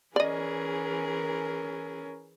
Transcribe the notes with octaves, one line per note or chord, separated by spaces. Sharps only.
E3 C#4 G#4 A#4 D5 D#5